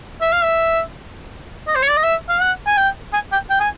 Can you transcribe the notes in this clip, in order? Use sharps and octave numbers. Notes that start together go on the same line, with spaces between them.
E5
F5
E5
D#5
C5
C#5
D5
D#5
E5
F5
F#5
G#5
G5
G#5
G5
G5
G#5